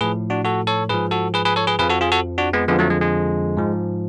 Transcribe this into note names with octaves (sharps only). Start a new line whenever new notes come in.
A2 F3 G#4 B4
D4 F#4
F#4 A4
A4 C#5
G#2 F3 G#4 B4
F#4 A4
G#4 B4
G#4 B4
A4 C#5
G#4 B4
F2 F3 G#4 B4
F#4 A4
F4 G#4
F#4 A4
D4 F#4
G#3 B3
F2 D3 F3 G#3 B3
F#3 A3
G#3
G#3
G#2 F3